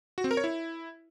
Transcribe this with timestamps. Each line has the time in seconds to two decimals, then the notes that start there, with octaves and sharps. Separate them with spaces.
0.18 F#4
0.24 C4
0.31 A#4
0.37 C#5
0.44 E4